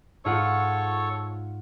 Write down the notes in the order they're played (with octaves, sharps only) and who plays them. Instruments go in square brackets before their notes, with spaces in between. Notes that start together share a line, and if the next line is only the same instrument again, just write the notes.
[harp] G#2 F4 F#5 [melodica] A4 C#5 C#6